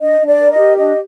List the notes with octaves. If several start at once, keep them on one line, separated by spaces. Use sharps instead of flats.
D4 D#5
D4
D5
A#4
D#5
G4
D4 D#5